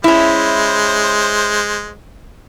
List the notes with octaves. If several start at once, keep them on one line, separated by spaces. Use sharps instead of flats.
G#3 C#4 E4 C5